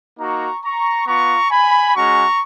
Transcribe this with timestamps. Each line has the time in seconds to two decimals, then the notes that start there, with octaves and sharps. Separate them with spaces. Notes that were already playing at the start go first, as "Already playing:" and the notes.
0.18 A#3 D#4 F#4 A#5 C#6
0.63 A#5 C#6
1.06 B3 F4 A#5 C#6
1.50 G#5 B5
1.94 G#3 C#4 F#4 A#5 C#6